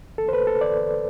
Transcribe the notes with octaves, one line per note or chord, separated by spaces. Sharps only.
A4
C5
B4
A4
D5